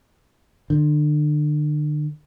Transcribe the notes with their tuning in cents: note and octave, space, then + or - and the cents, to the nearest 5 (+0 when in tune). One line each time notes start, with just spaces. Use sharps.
D3 +35